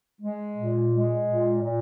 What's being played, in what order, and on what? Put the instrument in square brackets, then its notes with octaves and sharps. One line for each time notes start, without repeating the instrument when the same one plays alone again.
[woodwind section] G#3
A#2
G#3
A#2
A#2